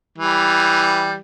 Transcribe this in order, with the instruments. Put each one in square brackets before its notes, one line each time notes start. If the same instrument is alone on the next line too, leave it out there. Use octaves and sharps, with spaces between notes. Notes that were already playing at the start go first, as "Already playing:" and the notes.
[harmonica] E3 G3